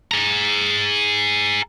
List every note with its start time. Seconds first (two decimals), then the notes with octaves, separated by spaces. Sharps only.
0.11 G#4 A#5